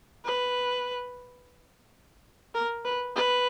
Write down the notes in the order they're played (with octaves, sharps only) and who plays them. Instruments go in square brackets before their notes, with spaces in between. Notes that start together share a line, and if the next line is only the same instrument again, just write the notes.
[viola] B4
A#4
B4
B4